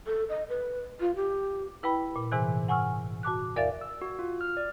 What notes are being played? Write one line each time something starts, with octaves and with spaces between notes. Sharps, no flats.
A4
D#5
B4
F4
G4
E4 B4 G5 B5
A#2
G#2 C3 E3 G#5 F#6
F#5 G#5 C#6 E6 F6
F#4 A5 D6 F#6
E2 A#4 D5 E5 F5 A6
E6
F#4
F4
F6
D5